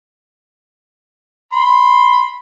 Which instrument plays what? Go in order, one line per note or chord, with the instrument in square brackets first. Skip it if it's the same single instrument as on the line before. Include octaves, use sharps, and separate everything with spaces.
[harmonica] B5 C6